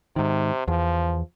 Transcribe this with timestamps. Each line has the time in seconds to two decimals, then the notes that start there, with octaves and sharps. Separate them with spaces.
0.16 G#2 C3 D#3
0.68 E2 F3